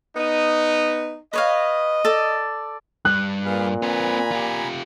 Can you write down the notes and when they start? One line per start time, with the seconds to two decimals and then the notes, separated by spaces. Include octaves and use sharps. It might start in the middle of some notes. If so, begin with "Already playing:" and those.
0.16 B3 D#4
1.33 B4 C#5 D#5 F5
2.05 A4 D5
3.05 G2 F#6
3.45 A#2 G#4 B4 F5
3.82 C4 B4 G#5 A#5 B5
4.32 F4 G4